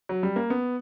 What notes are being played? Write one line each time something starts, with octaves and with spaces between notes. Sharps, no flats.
F#3
G3
A#3
B3